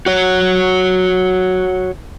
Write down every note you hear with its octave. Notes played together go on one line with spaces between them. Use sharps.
F#4 C#5